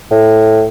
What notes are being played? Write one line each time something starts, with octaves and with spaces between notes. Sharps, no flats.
A2